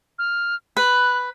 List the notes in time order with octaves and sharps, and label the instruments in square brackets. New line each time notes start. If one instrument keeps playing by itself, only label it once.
[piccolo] F6
[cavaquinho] B4 [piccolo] F#6